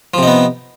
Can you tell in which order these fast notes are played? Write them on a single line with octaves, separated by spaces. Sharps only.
F3 C3 D#4 B3